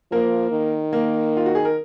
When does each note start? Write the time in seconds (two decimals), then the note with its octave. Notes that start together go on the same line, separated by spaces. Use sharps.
0.11 F3 A#3 A#4
0.52 D#3
0.93 A#3 A#4
1.37 F4
1.46 F#4
1.55 G#4
1.65 A#4